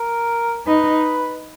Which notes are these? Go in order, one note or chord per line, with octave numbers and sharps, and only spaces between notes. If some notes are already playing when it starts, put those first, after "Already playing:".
Already playing: A#4
D#4 B4